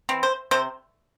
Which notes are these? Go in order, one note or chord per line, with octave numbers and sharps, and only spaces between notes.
E3 C4
C5
C3 C5